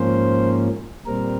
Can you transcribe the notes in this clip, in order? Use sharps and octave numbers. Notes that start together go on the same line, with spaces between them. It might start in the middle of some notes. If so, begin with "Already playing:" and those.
Already playing: G#2 F3 A#3 C#4 C5
A#2 G3 C4 A#4